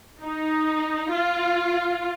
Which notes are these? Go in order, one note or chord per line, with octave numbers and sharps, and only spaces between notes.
D#4
F4